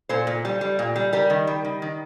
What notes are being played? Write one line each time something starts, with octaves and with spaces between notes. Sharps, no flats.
A#2 A4 C5
A#2
G3
G3
A#2
G3
G3 G4 A#4
D#3
G3
D#3
D#3